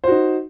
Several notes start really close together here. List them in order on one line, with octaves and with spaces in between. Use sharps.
C5 F#4 D#4